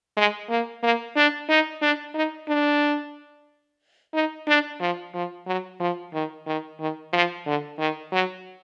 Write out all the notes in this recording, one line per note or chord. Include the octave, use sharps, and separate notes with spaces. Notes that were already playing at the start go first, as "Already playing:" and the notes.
G#3
A#3
A#3
D4
D#4
D4
D#4
D4
D#4
D4
F3
F3
F#3
F3
D#3
D#3
D#3
F3
D3
D#3
F#3